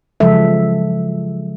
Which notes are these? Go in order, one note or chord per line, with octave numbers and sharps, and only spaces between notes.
C#3 F3 F#3 G#3 A4 E5